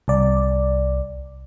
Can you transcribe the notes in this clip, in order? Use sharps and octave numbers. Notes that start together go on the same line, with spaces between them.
C2 D5